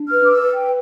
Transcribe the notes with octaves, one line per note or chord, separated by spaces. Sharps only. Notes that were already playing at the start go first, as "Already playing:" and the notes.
Already playing: D4
B4 F6
D6
E6
B4
G5